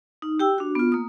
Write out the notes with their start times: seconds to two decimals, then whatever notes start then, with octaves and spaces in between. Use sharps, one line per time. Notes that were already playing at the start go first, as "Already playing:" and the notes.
0.22 D#4
0.40 G4 G5 E6
0.58 D4 F#4
0.75 B3 F4
0.92 A#3 D#6